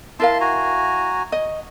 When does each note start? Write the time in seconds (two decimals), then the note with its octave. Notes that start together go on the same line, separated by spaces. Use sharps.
0.20 E4 A#4 F5 A5 C6
0.41 F#4 G#5 A#5
1.32 D#5